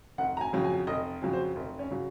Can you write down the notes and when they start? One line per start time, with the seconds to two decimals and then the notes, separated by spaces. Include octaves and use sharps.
0.18 F1 F#5
0.37 A#5
0.41 G#5
0.53 F2 C#3 F#3
0.64 G#5
0.87 F1 D#5
1.22 F2 C#3 F#3
1.33 C5
1.56 F1
1.79 C#4
1.91 C#3 F#3